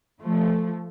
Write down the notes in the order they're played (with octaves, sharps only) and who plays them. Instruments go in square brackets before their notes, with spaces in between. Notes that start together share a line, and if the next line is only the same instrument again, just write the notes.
[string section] F3 A3